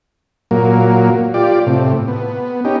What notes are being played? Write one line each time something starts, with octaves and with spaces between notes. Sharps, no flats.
A#2 F#3 A#3
F4 G4 D5
A2 C3
B3
C#4 D#4 G4